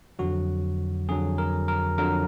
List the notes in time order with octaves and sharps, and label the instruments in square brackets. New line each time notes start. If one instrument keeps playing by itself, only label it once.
[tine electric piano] F2 D3 F#3 F#4
F2 D3 F#3 G#4
A#4
A#4
F2 D3 F#3 A#4